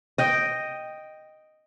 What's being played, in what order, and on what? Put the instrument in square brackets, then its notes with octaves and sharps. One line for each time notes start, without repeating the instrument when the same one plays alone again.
[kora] D#5 G5